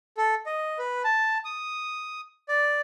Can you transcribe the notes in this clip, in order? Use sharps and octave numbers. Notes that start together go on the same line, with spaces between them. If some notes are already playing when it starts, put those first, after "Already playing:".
A4
D#5
B4
A5
D#6
D5